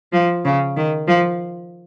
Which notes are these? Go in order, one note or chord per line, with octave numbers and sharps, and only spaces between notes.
F3
C#3
D#3
F3